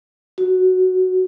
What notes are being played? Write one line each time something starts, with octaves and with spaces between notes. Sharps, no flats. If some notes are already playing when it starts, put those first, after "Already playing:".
F#4